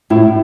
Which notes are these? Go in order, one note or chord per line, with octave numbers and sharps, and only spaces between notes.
A2 E4